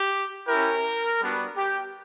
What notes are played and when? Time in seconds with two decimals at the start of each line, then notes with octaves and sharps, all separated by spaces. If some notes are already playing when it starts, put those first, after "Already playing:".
Already playing: G4
0.47 C#4 E4 G4 A#4
1.21 G3 B3 D4 F#4
1.56 G4